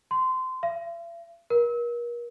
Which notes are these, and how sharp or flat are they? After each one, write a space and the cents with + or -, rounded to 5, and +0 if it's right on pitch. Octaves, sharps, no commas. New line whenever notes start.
C6 -20
E5 +45
A#4 +40